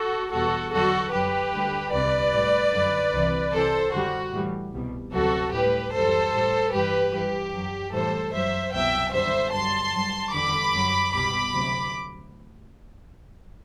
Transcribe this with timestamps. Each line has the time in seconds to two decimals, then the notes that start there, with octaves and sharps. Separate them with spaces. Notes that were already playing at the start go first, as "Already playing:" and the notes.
Already playing: F#4 A4
0.32 E2 B2 G3 F#4 A4
0.72 E2 D3 F#3 F#4 A4
1.12 F#2 F#3 G4 B4
1.53 D2 D3 G3
1.92 C2 C3 G3 B4 D5
2.32 A2 G3
2.72 F#2 D3 F#3
3.13 C2 C3 E3
3.52 C2 C3 E3 A4 C5
3.92 F#2 D3 G3 F#4
4.32 A2 E3 G3
4.73 C2 B2 G3
5.13 D2 C3 F#3 F#4 A4
5.52 A2 G3 G4 B4
5.93 F#2 E3 G3 A4 C5
6.33 A2 G3
6.73 G2 E3 G3 G4 B4
7.13 G2 E3 G3 G4
7.53 F#2 F#3
7.93 A2 E3 G3 A4 C5
8.33 F#2 F#3 C5 E5
8.73 C2 B2 F#3 E5 G5
9.13 F#2 D3 G3 C5 E5
9.53 G2 F#3 A5 C6
9.93 G2 F#3
10.33 E2 D3 G3 B5 D6
10.73 F#2 F#3
11.13 C2 B2 G3 B5 D6
11.53 D2 C3 F#3